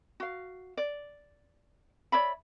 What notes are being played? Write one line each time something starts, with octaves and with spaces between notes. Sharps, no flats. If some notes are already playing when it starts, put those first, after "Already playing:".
F#4 F5
D5
C#5 D5 E5 B5